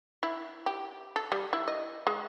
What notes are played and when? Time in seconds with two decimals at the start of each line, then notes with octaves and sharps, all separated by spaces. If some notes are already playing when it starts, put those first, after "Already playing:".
0.23 E4
0.66 G4
1.16 A4
1.32 G3
1.53 E4
1.68 D#5
2.07 G#3